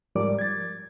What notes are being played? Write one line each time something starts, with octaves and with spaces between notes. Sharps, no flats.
G#2 F3 G3 A#4 D5 D6
G#6 A6